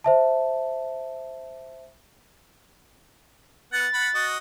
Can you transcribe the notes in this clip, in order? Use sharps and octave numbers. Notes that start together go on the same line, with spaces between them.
C5 E5 A5
B3 F#5 A6
F#5 B5
F#4 D#5